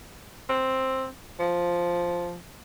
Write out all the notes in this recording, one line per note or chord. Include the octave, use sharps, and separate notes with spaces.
C4
F3